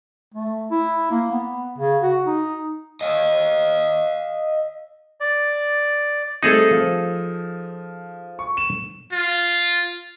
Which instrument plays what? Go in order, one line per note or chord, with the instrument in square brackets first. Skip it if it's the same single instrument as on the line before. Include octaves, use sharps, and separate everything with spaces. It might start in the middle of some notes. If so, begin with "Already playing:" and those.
[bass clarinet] A3
E4
A#3
B3
C#3
F#4
D#4
[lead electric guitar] D#5 F5
[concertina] D5
[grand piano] G3 A3 C4 [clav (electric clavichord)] D#4 G#4 A4
[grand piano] F3
C#6
E7
[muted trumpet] F4